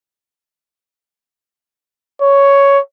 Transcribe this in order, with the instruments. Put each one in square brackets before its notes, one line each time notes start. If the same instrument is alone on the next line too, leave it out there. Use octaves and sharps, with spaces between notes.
[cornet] C#5